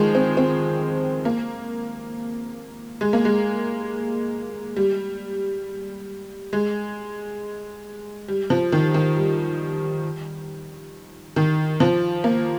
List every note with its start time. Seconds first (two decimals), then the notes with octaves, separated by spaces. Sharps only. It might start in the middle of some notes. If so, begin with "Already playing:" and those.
Already playing: D#3 F3 G#3
0.15 C4
0.37 C4
1.25 A#3
3.01 G#3
3.13 A#3
3.25 G#3
4.76 G3
6.53 G#3
8.28 G3
8.50 F3
8.72 D#3
8.94 D#3
9.17 G3
11.36 D#3
11.80 F3
12.24 A#3